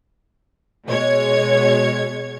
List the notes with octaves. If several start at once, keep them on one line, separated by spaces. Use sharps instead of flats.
B2 G#3 C#5 G#6